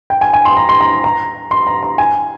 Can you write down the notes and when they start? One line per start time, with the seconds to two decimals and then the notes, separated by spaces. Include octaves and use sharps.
0.10 G5
0.21 G#5
0.33 G#5
0.45 C6
0.57 A#5
0.69 C6
0.81 A#5
1.04 A#5
1.51 C6
1.67 A#5
1.83 A#5
1.98 G#5